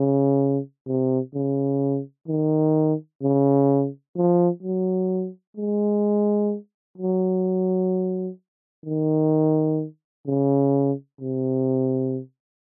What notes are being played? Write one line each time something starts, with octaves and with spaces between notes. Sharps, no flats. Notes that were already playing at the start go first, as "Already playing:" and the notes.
Already playing: C#3
C3
C#3
D#3
C#3
F3
F#3
G#3
F#3
D#3
C#3
C3